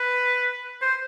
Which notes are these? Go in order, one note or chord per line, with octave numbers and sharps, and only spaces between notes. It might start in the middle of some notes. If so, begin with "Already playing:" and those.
Already playing: B4
C5